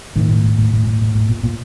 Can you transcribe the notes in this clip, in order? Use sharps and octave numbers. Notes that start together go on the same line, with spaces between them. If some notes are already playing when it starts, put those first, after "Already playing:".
A2 D#3
A2
A2
A2
A2
A2
A2
A2
A#2
A#2